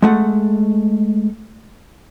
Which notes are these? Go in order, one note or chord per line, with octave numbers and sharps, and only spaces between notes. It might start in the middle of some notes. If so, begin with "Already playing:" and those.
G#3 A3 F#5